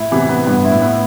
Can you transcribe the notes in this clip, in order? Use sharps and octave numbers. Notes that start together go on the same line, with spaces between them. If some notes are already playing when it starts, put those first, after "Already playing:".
Already playing: A2 E4
C3 E3 B3
B3
G2 B3
E4
A2
B3